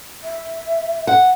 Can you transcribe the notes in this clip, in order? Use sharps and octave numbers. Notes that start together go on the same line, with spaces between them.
E5
F#5